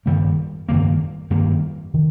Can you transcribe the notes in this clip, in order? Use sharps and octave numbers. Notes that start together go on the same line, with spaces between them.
G2 D#3 G3 A#3
G2 D#3 G3 A#3
G2 D#3 G3 A#3
D#3